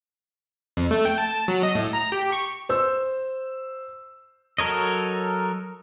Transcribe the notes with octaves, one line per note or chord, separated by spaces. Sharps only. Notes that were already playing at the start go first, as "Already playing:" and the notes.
F2
A3
G5
A5
F#3
D#5
A2
A#5
G4
C#6
C5 E6
F#3 A4 A#4 C#5 D#5